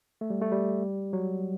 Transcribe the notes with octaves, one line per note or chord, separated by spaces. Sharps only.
A3
G3
A3
G3
F#3